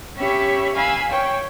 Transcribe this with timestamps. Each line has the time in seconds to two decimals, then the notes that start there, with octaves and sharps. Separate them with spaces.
0.18 C#4 G4 C#5 E5 B5
0.74 F5 G#5 B5 E6
1.11 C#5 G5